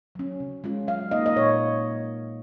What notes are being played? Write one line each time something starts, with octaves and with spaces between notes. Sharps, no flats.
F#3 C#4
C#3
G#3 C#4 F4
F#3 F5
A#3 D#4 D#5
D#5
A#2 C#5